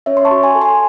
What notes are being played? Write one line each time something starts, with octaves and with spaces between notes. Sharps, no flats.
C#4 C#5 E5
C6
A5 C#6
F#4
G#5 C6
A4
G#5 C6